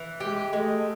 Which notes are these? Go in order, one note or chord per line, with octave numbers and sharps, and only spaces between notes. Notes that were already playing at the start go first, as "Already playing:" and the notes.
Already playing: E3
G#3 G4
G#3 A3